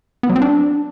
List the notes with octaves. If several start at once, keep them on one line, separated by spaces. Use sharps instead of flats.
B3
F#3
C4
D4